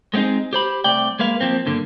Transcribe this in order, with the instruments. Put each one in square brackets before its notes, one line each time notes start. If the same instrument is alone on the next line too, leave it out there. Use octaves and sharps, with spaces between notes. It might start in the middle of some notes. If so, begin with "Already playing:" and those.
[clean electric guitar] G#3 B3 C4 D#4 G#4
G4 C5 B5
C2 C3 A3 D5 G5
G#3 A#3 B4 F5
F3 A#3 C4
G2 D3 A#3